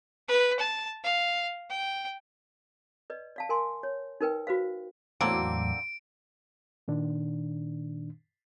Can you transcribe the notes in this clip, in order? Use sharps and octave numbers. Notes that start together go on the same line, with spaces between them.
B4
A5
F5
G5
B4 D5 D#5
D5 F5 A5
A#4 G#5 C6
C#5
D#4 A#4 B4 G5
F#4 B4 C5 F5
E2 A2 D3 F#3 A#3 C4 D7
A#2 D#3 D4